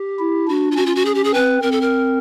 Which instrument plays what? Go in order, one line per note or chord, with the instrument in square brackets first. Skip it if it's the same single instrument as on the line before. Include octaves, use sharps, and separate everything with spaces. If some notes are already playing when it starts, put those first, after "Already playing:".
Already playing: [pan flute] G4
[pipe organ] E4
[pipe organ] D4 [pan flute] F#4
[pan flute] F4
[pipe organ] C#4 [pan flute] F#4
[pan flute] F4
F#4
G#4
G4
G#4
[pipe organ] C4 [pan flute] B4
[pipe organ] C4 [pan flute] A#4
[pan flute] A4
A#4